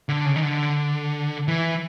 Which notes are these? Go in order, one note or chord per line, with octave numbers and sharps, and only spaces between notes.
D3
C#3
D#3
D3
E3